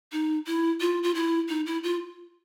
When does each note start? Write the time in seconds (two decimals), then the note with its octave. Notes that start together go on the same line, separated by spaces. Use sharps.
0.12 D#4
0.47 E4
0.81 F4
1.03 F4
1.15 E4
1.49 D#4
1.66 E4
1.83 F4